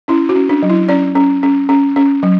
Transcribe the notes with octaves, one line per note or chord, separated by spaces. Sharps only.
C#4 E4
F#4
C#4
D4
F#3
E4
C#4 D5
C#4
C#4
C#4
C#4
F#3